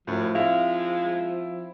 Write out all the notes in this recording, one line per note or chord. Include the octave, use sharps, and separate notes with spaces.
F#2 A2 F3
G#3 C4 E4 F5